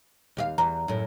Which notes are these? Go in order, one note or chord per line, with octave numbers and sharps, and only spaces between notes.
D#2 G4 F5
E2 A#5
F#2 A2